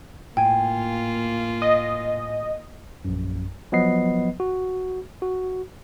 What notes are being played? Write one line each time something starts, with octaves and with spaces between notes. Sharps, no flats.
A2 A#3 F4 G5 G#5
D#5
A#1 F#2
F3 F#3 B3 B4 D#5 C7
F#4
F#4